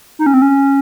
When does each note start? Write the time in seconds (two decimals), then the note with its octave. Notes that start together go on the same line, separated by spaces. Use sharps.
0.19 D#4
0.26 C#4
0.34 C4
0.42 C#4